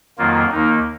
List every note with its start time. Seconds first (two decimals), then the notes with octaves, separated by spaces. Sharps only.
0.18 F2 D#3 F#3 A#3 F4
0.52 D#2 D#3 A#3 D#4